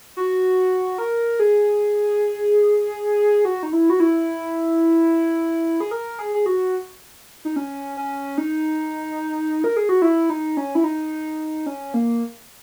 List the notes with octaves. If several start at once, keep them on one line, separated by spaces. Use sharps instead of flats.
F#4
A#4
G#4
F#4
D#4
E4
F#4
E4
G#4
A#4
G#4
G#4
F#4
D#4
C#4
C#4
D#4
A#4
G#4
F#4
E4
D#4
C#4
E4
D#4
C#4
A#3